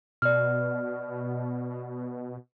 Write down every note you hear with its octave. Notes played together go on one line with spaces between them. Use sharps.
B2 D5 F6